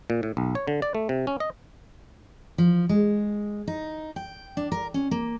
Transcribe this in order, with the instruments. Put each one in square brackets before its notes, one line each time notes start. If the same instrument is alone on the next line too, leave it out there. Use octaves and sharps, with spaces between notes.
[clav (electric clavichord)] A#2
A2
B1
C#5
D3
D5
A3
C3
C#4
D#5
[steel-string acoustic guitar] F3
G#3
D#4
G5
D4
A#4
C#4
A#3